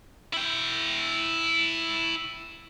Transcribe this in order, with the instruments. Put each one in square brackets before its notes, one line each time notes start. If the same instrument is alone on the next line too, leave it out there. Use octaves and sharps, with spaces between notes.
[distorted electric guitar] E4 G5